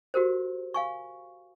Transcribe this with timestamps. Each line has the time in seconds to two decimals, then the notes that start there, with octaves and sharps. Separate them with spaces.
0.14 F#4 G4 A#4 C5
0.74 F5 G#5 C#6